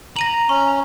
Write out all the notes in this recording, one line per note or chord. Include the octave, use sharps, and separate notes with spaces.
A#5 A#6 D#7 F#7
C#4 C#6